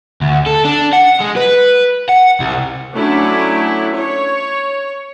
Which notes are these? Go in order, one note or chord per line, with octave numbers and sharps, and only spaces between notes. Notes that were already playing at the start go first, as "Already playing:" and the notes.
D2
A4
D4
F#5
G#3
B4
F#5
C2
F#3 A3 C#4 D4 E4
C#5